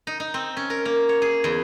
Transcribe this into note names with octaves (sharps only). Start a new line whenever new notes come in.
D#4
D#4
C4
C#4
A#4
A#3
C#5
G#4
E2